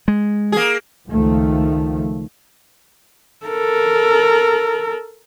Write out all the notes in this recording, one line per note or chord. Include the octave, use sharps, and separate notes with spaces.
G#3
A#3 G#4
C#2 D#3 F3 A3
A4 A#4